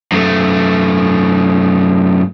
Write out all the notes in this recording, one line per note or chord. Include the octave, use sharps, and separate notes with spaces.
F#2 A3